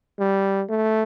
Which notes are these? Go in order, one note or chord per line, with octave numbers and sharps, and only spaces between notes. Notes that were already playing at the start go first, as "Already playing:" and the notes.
G3
A3